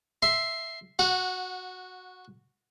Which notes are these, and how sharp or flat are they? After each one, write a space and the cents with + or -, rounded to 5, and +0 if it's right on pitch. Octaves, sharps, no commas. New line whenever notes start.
E5 +0 C6 +0
F#4 -5 F#5 -25